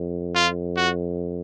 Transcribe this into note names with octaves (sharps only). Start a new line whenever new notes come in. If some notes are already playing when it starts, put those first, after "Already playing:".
Already playing: F2
F4
F#4